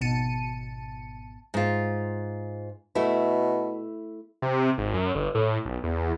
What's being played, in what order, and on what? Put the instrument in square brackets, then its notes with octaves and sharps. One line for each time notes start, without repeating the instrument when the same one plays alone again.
[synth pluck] G#1 B2 A5 C#7 D#7
[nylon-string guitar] G#2 F4
[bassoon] B2 [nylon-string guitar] A3 E4
[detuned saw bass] C3
G#1
F#2
G1
A2
B1
E2